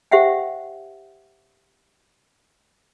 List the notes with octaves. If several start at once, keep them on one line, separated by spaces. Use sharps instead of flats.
G4 C5 E5 F#5 G5